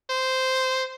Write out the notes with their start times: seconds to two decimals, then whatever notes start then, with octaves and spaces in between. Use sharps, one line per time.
0.10 C5